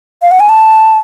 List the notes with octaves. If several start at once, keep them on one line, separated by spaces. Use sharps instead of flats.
F5
F#5
G#5
A5